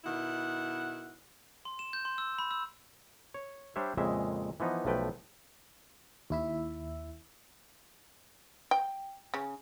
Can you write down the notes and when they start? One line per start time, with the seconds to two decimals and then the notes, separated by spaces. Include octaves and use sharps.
0.04 B2 D#3 E4 F#5
1.65 C6
1.79 E7
1.93 G6
2.05 C6
2.18 E6
2.39 B5
2.51 E6
3.34 C#5
3.76 G3 D4 C5 C#5 E5
3.97 F2 A#2 C#3 G#3 E5
4.60 E3 F3 B3 D#4
4.85 B1 F3 A3 B4 G5
6.30 D#2 E4 E5
8.71 G5
9.34 C#3